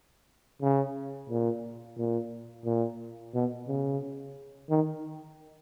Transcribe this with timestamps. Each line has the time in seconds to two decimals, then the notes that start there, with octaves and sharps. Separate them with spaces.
0.62 C#3
1.29 A#2
1.98 A#2
2.65 A#2
3.34 B2
3.68 C#3
4.70 D#3